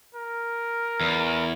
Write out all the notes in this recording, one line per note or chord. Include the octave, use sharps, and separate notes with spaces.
A#4
E2